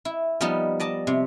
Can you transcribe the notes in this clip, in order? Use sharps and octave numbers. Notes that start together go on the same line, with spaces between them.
E4
F3 G3 B3 D#4
D5 D#5 A5
C3